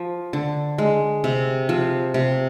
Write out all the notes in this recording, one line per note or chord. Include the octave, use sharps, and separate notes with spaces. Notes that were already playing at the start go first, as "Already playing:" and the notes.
Already playing: F3
D3
G#3
C3
F3
C3